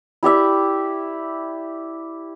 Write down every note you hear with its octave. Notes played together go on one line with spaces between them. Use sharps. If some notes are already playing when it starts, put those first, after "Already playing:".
E4 G4 D5 E5